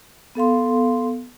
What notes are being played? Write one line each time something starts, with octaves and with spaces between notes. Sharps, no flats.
B3 A4 F5 C6